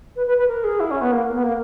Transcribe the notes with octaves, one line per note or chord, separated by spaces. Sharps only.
B4
B4
B4
A#4
G#4
E4
C#4
B3
A#3
B3
A#3